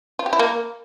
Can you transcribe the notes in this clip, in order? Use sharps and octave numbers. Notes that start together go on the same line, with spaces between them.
F4
G4
E4
A#3